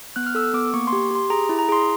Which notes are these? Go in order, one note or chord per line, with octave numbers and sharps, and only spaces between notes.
B3 F#6
F6
A4 E6
B3 D6
A#3 C#6
C6
G4
G4 C6
G#4 A#5
E4
A#5
G#4 C6